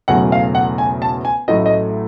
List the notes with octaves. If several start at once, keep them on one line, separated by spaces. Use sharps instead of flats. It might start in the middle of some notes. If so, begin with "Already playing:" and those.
E1 E2 C#3 F#3 A3 F#5
F5
F#5
G#5
A5
G#5
A1 A2 F#3 A3 D#5
D#5